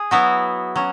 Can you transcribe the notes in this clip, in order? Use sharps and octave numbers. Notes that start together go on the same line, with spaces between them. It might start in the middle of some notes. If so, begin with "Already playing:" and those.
Already playing: G#4
F#3 B3 E4 F#4
F#3 C#4